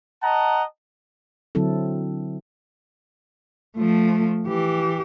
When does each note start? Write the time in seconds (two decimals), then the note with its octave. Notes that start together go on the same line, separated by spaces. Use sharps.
0.22 D#5 F#5 A5 A#5
1.55 D3 F#3 C4 E4 A4
3.77 F3 A3
4.47 E3 G4